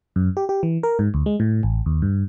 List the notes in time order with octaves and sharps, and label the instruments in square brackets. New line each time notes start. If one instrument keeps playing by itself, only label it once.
[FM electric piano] F#2
G4
G4
E3
A#4
G#2
D2
G#3
A2
A1
D#2
G2